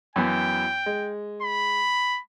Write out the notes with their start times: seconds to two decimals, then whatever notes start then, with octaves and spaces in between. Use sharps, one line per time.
0.16 F#2 E3 B3 G5
0.86 G#3
1.43 B5